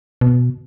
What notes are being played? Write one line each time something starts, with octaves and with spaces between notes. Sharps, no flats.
B2